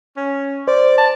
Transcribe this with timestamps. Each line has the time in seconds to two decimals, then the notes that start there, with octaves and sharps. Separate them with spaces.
0.16 C#4
0.68 C5 D5
0.98 A5